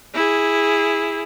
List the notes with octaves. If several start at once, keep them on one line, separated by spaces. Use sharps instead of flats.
E4 G#4